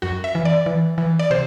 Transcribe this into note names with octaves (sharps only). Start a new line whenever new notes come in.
F#2 F#4
E5
E3
D5
E3
E3
D5
C3 C5